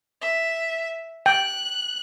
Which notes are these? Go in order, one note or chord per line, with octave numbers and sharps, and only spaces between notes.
E5
G5 F#6